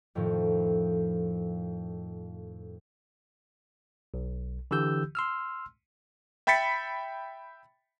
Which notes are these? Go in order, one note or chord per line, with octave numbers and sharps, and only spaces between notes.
F2 A2 D#3 F3
B1
D3 E3 G4 E6 G6
C6 E6 F6
E5 G5 B5 A6 B6 C#7